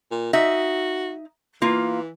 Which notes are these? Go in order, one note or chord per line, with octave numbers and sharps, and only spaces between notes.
A#2
D#4 F#4 E5
E3 A#3 F4